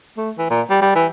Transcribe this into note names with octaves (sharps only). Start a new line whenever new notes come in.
A3
E3
A#2
G3
G3
E3